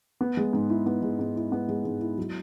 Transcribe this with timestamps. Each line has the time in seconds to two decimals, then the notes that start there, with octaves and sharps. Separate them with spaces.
0.21 B3
0.37 G#3
0.53 G#2
0.70 E4
0.86 B3
1.02 G#3
1.19 G#2
1.36 E4
1.52 B3
1.69 G#3
1.85 G#2
2.01 E4
2.18 F#3